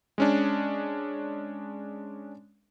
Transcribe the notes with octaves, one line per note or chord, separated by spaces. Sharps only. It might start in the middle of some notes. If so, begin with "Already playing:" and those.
G#3 C#4 D4